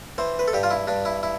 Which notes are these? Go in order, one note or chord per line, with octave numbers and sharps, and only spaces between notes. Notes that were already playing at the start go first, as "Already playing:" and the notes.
E3 C5
B4
A4
G2 G4
F4
E4
G2 D4
E4
E4